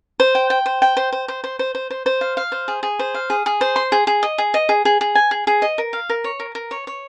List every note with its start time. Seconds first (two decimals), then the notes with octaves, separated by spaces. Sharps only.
0.20 C5
0.35 G5
0.50 G5
0.66 C5
0.82 G5
0.97 C5
1.13 C5
1.28 C5
1.44 C5
1.59 C5
1.75 C5
1.90 C5
2.06 C5
2.21 F5
2.37 F5
2.52 C5
2.68 G#4
2.83 G#4
2.99 C5
3.14 F5
3.30 G#4
3.46 G#4
3.61 C5
3.76 C6
3.92 G#4
4.07 G#4
4.23 D#5
4.38 G#4
4.54 D#5
4.69 G#4
4.85 G#4
5.01 G#4
5.15 G#5
5.31 G#4
5.47 G#4
5.62 D#5
5.78 A#4
5.93 F5
6.10 A#4
6.24 C#5
6.40 A#4
6.55 A#4
6.71 C#5
6.87 C#5